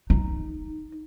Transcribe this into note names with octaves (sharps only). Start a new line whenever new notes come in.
D#4